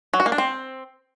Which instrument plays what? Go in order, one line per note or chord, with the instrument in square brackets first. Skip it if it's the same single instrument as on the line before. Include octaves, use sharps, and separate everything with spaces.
[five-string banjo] F#3
F#4
A#3
D4
C4